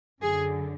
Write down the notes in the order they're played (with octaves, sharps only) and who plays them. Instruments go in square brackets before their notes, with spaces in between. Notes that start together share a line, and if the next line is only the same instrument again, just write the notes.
[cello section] F#2 D3 G#4